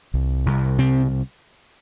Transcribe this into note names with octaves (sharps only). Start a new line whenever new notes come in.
C2
C2
C3 C4